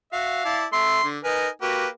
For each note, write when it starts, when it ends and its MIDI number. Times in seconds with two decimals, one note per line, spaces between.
0.13 0.40 66
0.13 0.40 76
0.13 0.59 77
0.45 0.65 64
0.45 0.65 74
0.45 0.65 81
0.73 0.99 57
0.73 0.99 76
0.73 1.06 84
1.04 1.18 50
1.24 1.49 63
1.24 1.49 70
1.24 1.48 71
1.24 1.49 80
1.62 1.88 58
1.62 1.86 66
1.62 1.88 67
1.62 1.88 71